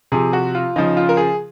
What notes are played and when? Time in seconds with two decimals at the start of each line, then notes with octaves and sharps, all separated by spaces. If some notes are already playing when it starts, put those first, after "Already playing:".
0.12 C3 F3 G#4
0.33 F#4
0.55 F4
0.76 C#3 F3 D#4
0.97 F4
1.09 A#4
1.17 G#4